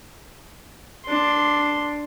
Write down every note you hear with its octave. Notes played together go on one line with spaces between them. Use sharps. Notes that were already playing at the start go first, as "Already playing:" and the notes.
D4 C6